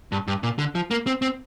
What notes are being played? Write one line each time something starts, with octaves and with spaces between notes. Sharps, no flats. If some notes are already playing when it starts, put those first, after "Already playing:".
G2
G2
A#2
D3
F3
A#3
C4
C4